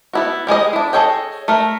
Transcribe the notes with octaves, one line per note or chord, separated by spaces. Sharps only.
B3 E4 F#4
G3 G#3 G#4 D#5
D4 E4
G#4 A4 C#5 D#5 G5
A3 A#4